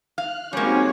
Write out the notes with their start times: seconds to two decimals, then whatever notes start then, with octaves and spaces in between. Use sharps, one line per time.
0.18 F5 F6 F#6
0.53 G3 G#3 A#3 C4 C#4 D#4 F#4 C#5